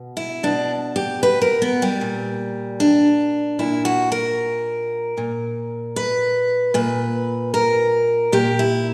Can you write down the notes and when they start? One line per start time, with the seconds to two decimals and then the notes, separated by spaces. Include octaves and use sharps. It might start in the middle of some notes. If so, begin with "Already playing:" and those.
Already playing: B2
0.17 E4
0.43 B2 D4
0.96 G4
1.23 B4
1.42 A#4
1.62 B3
1.82 G3
2.01 A#2
2.80 D4
3.59 A#2 E4
3.85 F#4
4.12 A#4
5.17 A#2
5.96 B4
6.74 A#2 B4
7.54 A#4
8.32 A#2 G4
8.59 E4